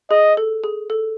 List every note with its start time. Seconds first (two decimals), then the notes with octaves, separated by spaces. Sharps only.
0.10 G#4 D#5
0.37 A4
0.64 G#4
0.90 A4